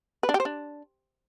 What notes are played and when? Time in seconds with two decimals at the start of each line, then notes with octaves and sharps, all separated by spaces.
0.23 B4
0.29 D4
0.34 G4
0.40 C5
0.45 D4